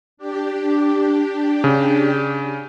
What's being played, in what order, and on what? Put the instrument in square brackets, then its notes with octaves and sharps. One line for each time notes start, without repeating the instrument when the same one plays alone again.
[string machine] D4 G4
[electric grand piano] C#3